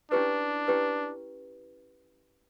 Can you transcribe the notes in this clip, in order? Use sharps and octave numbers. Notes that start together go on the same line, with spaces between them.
C#4 D4 E4 G4 B4
C#4 E4 G4 B4